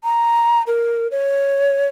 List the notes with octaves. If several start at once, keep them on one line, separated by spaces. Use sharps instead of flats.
A#5
A#4
C#5